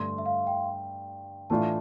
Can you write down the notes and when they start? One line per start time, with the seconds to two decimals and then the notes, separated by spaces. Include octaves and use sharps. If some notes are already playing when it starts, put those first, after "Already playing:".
Already playing: G2 D3 A3 C6
0.18 E5
0.26 F5
0.47 G5
1.50 A2 E3 A3 D4 F4 A5